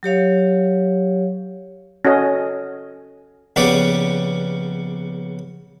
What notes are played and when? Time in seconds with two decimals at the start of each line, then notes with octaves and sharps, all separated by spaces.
0.03 F#3 G4 C#5 F5
2.05 C#4 F#4 A4 D#5
3.56 A#1 C#3 B3 C#4 G4 D5